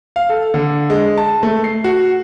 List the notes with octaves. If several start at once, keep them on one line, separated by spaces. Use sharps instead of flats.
F5
A4
D3
G#3
A5
A3
C7
F#4